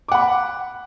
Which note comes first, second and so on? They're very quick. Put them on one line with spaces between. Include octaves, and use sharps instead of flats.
D6 F#5 B5